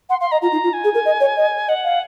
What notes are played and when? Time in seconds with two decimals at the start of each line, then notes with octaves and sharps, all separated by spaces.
0.09 F#5 C6
0.21 F5 C6
0.31 D#5 A#5
0.42 F4 A#5
0.52 D#4
0.63 F4
0.73 G#5
0.84 G#4
0.94 A#4
1.05 D#5
1.20 C#5
1.36 D#5
1.68 D#5 F#5
1.84 F5